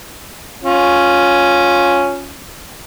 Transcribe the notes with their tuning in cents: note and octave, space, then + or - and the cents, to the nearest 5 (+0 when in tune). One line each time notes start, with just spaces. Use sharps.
C#4 +0 F4 +15